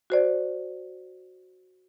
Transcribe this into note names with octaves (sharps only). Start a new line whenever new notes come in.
F#4 C5 D5